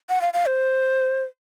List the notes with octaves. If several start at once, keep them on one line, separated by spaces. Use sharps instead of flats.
F#5
F5
F5
C5